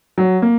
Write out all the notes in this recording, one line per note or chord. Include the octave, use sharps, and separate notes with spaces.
F#3
A#3